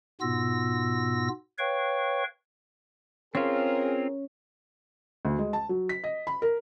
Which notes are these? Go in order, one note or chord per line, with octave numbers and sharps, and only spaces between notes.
G#2 B2 B3 F4 E6 A#6
B4 C#5 F5 G5 C#6
C4 C#4 F4 G#4 A#4
D2
G#3
A5
F#3
B6
D#5
B5
A#4